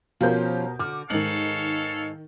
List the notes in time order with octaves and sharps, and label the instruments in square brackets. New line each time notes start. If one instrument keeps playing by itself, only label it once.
[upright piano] B2 A#4 G6 [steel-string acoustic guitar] F3 C#4 [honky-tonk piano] F4 G4 C5
[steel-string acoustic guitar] D3 F#4 [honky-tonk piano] D6 [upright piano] F6
[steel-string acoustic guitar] G#2 D#4 G#4 [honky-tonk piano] D#3 F#7 [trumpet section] A4 C#5 F5